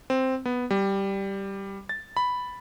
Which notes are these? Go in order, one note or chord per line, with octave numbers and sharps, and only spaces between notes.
C4
B3
G3
A6
B5